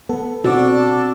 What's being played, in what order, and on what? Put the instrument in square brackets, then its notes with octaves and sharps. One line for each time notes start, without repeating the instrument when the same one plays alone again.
[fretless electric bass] B3 [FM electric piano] A4
[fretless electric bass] B2 [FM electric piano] C4 D5 D6 [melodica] D4 A4 A5 [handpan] F#4